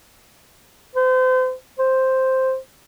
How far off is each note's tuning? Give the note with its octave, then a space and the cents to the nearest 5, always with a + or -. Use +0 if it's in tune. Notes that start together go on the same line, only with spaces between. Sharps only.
C5 -35
C5 +0